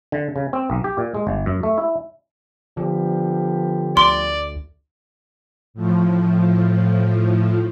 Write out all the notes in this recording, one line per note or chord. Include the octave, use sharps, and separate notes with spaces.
D3
C#3
C4
B1
G4
A#2
G#3
G1
F#2
A3
E4
D3 F3 B3 G4
D2 D5 C6
A2 F3